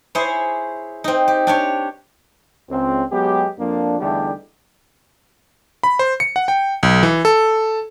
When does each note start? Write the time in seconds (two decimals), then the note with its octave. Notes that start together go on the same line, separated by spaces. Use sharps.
0.15 E4 G#4 C5 C#5
1.04 C4 D#4
1.28 G4
1.47 D4 G4 C#5
2.70 C#2 C4
3.11 F#3 G#3 B3 G4
3.58 F2 F3 A#3 D4
4.00 E2 D3 G3 A3 D#4 G4
5.83 B5
5.99 C5
6.20 C#7
6.36 F#5
6.48 G5
6.83 B1
7.03 E3
7.25 A4